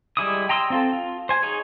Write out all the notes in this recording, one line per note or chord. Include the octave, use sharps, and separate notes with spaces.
G3 G#3 E4 D6 D#6
G5 A#5 C6 D#6 E6
C4 F4 A4
F4
C5 G#5
D#4 G#4 C#5